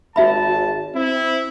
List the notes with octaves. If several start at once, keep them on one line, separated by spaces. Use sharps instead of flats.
G#1 F#4 E5 A5 B5
C4 E4